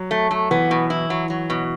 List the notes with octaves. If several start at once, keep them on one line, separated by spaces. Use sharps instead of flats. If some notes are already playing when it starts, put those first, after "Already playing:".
Already playing: F#3
A3
A3
E3 B3
B2
E4
F#3
F#3
B2